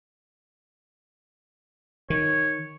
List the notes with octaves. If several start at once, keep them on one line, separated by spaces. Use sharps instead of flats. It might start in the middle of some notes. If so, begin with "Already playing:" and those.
D#3 C#5